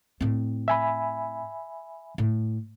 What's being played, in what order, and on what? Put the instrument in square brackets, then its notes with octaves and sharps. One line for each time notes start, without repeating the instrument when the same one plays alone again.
[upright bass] A2 C4
[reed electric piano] E5 G#5 B5
[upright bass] A2